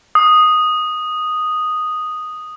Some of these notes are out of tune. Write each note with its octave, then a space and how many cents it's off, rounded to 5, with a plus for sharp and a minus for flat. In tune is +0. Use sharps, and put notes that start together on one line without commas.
D#6 -5